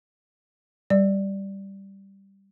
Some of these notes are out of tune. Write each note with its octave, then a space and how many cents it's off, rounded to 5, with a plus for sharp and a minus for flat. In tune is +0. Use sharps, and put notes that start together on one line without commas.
G3 +0 D5 +0